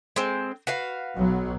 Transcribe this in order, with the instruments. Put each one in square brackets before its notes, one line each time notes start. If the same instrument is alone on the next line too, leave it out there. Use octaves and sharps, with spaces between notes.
[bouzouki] G#3 C4
F#4 B4 F5
[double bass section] B1 F#3